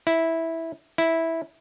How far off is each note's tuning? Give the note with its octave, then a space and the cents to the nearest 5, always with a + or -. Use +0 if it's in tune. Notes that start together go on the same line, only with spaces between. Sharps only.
E4 -10
E4 -10